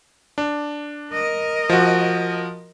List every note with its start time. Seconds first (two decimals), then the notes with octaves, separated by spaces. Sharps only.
0.38 D4
1.12 A#4 D#5
1.69 F3 F#4